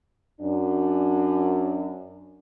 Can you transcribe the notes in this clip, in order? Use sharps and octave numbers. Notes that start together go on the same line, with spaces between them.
F#2 D4